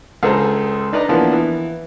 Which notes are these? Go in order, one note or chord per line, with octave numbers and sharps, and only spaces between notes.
C#2 G#4 A4 C5 A#5
D4 D#4 B4 D5 D#5 A#5
E3 F3 A#3 B3 D4
E3